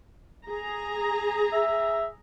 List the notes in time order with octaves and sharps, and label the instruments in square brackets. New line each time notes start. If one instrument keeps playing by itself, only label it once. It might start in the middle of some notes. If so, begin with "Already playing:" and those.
[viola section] G#4 A#5
[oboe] E5